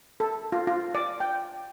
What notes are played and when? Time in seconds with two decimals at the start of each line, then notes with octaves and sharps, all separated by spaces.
0.20 A4
0.52 F4
0.67 F4
0.95 D5
1.20 G5